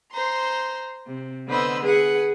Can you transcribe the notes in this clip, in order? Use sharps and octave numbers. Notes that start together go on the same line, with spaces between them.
C5 A#5 C6
C3
D3 B3 B4 C5 D#5 E6
G#4 B4 F#5